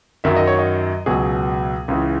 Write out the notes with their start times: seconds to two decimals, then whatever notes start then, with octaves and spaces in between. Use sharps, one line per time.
0.24 F#2 D#3 F#3 E5
0.36 D#5
0.47 C#5
0.59 D#5
1.06 C#2 B2 F#3 G#4
1.88 C#2 C#3 E3